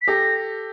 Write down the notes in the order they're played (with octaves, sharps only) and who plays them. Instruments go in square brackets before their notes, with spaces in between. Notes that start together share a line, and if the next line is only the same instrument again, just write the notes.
[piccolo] B6
[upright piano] G4 A4 [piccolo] A#6